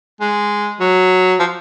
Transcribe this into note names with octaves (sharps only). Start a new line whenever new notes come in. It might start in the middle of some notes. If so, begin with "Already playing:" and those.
G#3
F#3
F3